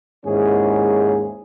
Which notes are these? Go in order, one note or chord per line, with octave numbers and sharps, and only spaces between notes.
D#2 G#2 C#4 E4 G#4